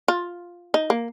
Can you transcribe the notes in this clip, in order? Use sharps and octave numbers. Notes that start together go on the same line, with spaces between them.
F4
D#4
A#3